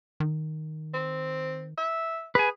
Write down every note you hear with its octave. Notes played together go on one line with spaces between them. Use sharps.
D#3
C4
E5
G#4 B4 G#5